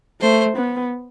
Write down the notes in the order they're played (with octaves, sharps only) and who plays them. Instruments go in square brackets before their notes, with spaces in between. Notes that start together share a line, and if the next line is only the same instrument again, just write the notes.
[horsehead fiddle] A3 [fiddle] C5
[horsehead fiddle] B3